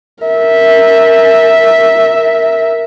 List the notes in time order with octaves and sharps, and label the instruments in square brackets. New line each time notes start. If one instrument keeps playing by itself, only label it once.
[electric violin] A#4 E5